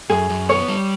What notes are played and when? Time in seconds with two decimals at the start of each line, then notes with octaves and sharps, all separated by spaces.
0.10 F#2 G#4
0.30 F#2
0.49 B3 C#5
0.68 G3